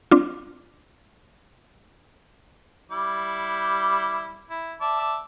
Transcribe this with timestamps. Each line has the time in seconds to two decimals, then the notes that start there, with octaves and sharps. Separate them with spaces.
0.11 C4 D4 F4
2.91 G3 E4 D6
4.50 E4
4.81 D5 E5 A5